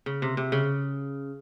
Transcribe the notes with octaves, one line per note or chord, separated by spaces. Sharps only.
C#3
C3
C3
C#3